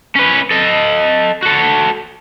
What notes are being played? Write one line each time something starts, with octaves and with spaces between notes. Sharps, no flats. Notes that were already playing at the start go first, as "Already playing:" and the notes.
C#4 B4
A4 D#5
F#4 A4